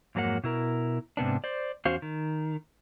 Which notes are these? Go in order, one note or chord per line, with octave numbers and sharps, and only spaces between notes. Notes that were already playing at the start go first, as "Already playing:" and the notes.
F2 G#2 F#3 A#3 F#5
B2 E4 A#4
G#2 C3 B3 D4
C5 D5
E2 C#4 F#4 C5 F5
D#3